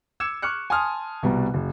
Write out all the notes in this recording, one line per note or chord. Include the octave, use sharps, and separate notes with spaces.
D6 E6 G#6 C#7 E7
C#6 D6 F6 F#6 C#7
G#5 A5 C6 D#6 F6
C2 B2 G3 A#5
F#1